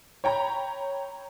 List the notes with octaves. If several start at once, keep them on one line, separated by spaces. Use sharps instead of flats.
C#5 G5 A#5 B5